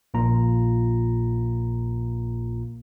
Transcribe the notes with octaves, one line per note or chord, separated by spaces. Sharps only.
A#1 A#2 A#3 F4 A#5